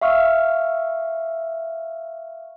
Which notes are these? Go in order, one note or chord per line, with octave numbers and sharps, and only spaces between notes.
E5 F5 C#6 E6 F6